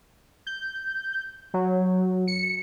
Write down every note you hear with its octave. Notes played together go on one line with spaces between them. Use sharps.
G6
F#3
C#7